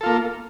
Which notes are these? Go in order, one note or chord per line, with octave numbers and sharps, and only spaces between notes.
A#3 F4 A4